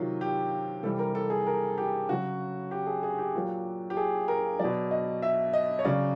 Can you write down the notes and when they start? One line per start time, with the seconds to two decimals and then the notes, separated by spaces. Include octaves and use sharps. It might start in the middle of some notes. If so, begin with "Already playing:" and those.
Already playing: C3 D#3 F#3 F4
0.21 G4
0.83 C3 E3 G3 A4
0.99 A#4
1.15 A4
1.30 G#4
1.47 A#4
1.78 G4
2.09 C#3 F#3 F#4
2.71 G4
2.87 G#4
3.03 G#4
3.18 G4
3.35 A#2 F#3
3.90 G4
3.97 G#4
4.28 A#4
4.59 B2 F#3 D5
4.91 D#5
5.22 E5
5.53 D#5
5.79 C#5
5.85 C#3 F#3 D5